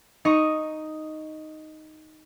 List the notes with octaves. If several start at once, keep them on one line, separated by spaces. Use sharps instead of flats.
D#4 D#5 C#6